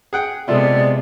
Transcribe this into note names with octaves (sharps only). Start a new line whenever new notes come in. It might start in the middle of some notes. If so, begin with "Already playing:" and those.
G#4 F#5 G5
C3 G#3 B3 E4 F4 A4 D5